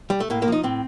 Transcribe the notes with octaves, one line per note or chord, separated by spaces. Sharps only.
G3
A3
A2 A#3
A#3
F3 D#4
A2 C4